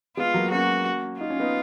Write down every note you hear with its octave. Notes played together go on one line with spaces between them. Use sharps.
G#3 B3 F4
F#3 A#3
A#3 C#4 F#4
D#4 F4
C#4
B3 D#4